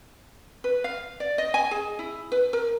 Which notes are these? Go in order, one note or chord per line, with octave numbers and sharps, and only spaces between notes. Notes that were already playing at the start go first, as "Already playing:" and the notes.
B4
F5
D5
D#5
G#5
G#4
E4
B4
A#4